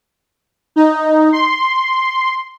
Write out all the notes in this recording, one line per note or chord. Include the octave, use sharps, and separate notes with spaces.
D#4
C6